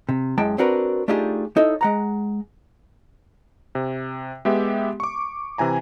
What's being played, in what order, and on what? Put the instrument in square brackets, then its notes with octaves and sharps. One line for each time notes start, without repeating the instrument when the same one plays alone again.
[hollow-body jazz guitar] C3
F#2 G#3 E4 G5 A5
C4 D4 F#4 A#4 B4
A3 D4 D#4 F4 G4 G#4
D#4 E4 A4 C#5
G#3 F#5 A#5
[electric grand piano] C3
G#3 B3 G4 E5
C#6 D6
C3 E3 G#5 A#5